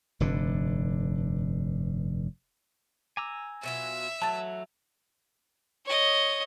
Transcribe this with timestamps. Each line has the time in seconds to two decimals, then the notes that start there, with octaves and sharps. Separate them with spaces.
0.20 F1 G2 D3
3.17 G#5 A#5 D6 E6
3.63 B2 F#3 F4 E5
4.22 E3 F#3 A3 A5 A6
5.85 C#5 D#5